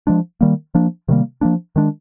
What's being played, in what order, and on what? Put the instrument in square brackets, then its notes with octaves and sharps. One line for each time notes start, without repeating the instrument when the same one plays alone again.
[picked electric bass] F3 G#3 D4
D#3 G3 A#3
F3 A#3 D4
C3 D#3 G3 A#3
F3 A#3 D4
D#3 G#3 D4